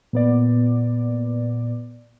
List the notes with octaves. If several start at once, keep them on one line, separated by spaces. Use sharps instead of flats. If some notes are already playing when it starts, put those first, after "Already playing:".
A#2 B3 D5